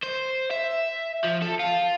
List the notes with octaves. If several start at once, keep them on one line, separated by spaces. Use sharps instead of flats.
C5
E5
F3
A4
F4